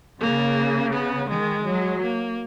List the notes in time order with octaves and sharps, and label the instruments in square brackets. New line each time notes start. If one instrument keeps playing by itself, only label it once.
[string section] C#3 [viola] A#3
[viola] B3
[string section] D#3 [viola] G#3
[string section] F#3
[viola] A#3